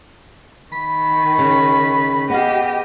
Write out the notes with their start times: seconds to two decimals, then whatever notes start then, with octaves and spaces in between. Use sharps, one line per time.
0.72 D#3 B5
1.38 C#3
2.30 B3 G4 G#4 D#5 F5